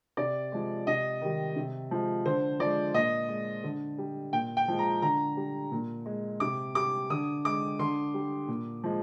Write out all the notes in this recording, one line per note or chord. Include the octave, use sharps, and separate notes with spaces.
C3 D5
F3 G#3
C3 D#5
D#3 G3
C3
F3 G#3
D3 C5
F3 G#3 D5
A#2 D#5
G#3
D3
G3
A#2 G5
G5
F3 G#3
A#5
D3 A#5
G3
A#2
G#3
C3 D6
G3 D6
D3 D#6
G#3 D6
D3 C6
G3
A#2
F3 G#3